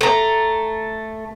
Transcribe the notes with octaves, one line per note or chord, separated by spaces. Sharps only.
A3 A#5